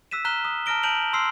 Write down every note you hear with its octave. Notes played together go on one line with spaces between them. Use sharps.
E6 F#6 B6 D#7 E7
A#5 F6 F#6 B6 E7 G7
D#6
A5 A#5 F6 A#6 D7 G7
A5 G6 D7 F7 F#7
C6 E6 F6 C7